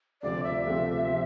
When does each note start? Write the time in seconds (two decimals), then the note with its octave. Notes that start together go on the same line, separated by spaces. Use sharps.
0.22 D2 C3 F3 A3 C4 D5
0.43 E5
0.65 D2 C3 F3 A3 C4
1.07 C3 F3 A3 C4